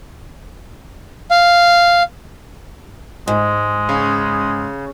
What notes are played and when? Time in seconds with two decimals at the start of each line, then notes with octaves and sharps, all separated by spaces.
1.31 F5
3.28 G#2 G#3
3.89 C#3